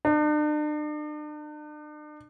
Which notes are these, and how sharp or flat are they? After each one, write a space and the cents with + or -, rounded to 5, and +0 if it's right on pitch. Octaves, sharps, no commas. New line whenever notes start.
D4 +40